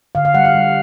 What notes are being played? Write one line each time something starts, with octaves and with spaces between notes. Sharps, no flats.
D3 F5
F5
G3 F#5
F5
G3